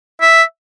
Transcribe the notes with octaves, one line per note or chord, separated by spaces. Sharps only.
E5